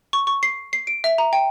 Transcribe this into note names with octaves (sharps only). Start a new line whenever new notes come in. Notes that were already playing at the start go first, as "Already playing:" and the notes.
C#6
C#6
C7
C7
D7
E5
A#5
G5